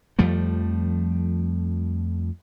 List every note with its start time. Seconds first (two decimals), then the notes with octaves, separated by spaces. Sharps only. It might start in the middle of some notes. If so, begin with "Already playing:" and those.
0.19 F2 F3 G3 A3